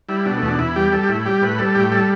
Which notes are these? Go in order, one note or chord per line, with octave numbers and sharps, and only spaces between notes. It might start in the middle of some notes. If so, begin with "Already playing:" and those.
G3 E4
B2 D4
E2 A3
D4
E2 E4
G3 G4
G3 A4
G4
A2 E4
G3 G4
A2 B4
G3 A4
A2 G4
G3 A4